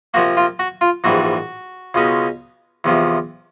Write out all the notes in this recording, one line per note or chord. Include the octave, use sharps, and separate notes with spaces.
C3 F3 A#3 F#4
F4
F#4
F4
A#1 G#2 E3 G3 F#4
C#2 B2 G#3 C#4
E2 C3 F3